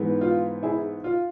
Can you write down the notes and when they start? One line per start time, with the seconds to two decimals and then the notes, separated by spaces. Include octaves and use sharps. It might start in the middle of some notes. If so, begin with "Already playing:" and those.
Already playing: G#2 E3 B3
0.21 F4
0.63 E4 G#4
1.04 F4